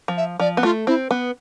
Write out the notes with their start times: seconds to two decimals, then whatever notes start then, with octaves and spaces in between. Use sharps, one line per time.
0.08 F3
0.17 E5
0.40 F3 D5
0.57 B3
0.63 A3 F4
0.87 C4 E4
1.11 B3